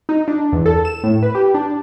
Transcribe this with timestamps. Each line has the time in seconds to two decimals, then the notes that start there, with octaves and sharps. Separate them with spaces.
0.09 D#4
0.28 D4
0.52 E2
0.66 A4
0.85 E7
1.03 A2
1.23 B4
1.35 G4
1.54 D4